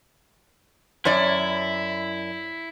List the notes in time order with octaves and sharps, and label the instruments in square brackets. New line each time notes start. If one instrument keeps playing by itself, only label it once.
[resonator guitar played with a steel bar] F#2 C#5 D5 [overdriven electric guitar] E4